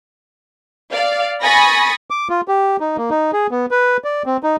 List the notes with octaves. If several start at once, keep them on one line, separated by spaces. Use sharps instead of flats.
D5 F5
G#5 B5 C#6 D#6 A6 A#6
D6
F4
G4
D#4
A#3
D#4
G#4
B3
B4
D5
C4
D#4